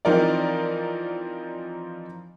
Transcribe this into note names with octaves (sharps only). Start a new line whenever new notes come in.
E3 F3 C4 D#4 A#4 D5